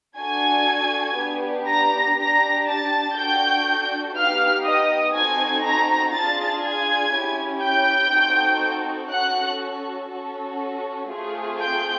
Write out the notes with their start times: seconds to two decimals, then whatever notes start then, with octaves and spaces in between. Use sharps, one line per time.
0.19 D4 F#4 A4 G#5 G#6
1.18 B3 D4 G4
1.68 A#5 A#6
2.17 D4 G4 A#5 A#6
2.67 A5 A6
3.16 D4 F#4 A4 G5 G6
4.16 B3 D#4 G4 F5 F6
4.65 D#5 D#6
5.14 C4 D#4 F#4 A4 G#5 G#6
5.64 A#5 A#6
6.14 D4 F4 G#4 A5 A6
6.64 G#5 G#6
7.13 C#4 E4 G4
7.63 G5 G6
8.12 C4 D#4 F#4 A4
9.11 C#4 F#4 A4 F#5 F#6
10.12 C#4 F#4 A4
11.10 A3 C4 F4 G#4
11.59 G5 G6